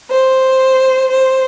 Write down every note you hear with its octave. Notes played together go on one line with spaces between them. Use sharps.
C5
C5